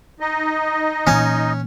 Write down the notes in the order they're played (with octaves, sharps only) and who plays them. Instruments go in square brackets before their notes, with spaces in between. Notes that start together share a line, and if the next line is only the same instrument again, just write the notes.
[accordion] D#4 D#5
[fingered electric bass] A#2 E3 [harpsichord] C#4